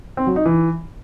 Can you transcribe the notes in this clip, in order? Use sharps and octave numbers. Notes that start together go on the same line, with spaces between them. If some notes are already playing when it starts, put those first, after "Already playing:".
C4
F#3
D#4
E3